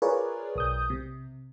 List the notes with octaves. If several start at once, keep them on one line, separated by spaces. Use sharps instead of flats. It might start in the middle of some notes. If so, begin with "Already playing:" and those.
F4 G#4 A#4 B4 C#5 D5
B1 D#6 G6
C3